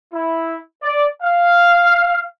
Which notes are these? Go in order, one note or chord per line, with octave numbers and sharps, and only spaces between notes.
E4
D5
F5